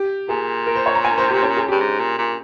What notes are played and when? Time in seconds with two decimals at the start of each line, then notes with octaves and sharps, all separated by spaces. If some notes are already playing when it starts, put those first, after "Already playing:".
Already playing: G4
0.29 A#2 G#4
0.66 A#4
0.76 C5
0.86 C#5
0.95 A#5
1.04 G#5
1.18 C5
1.30 G4
1.42 C#4
1.57 G#4
1.68 G2 G4
1.80 G#2
1.99 A#2
2.18 A#2